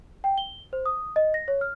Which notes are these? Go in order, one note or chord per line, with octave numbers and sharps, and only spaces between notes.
G5
G7
C5
D#6
D#5
A#6
C#5
F6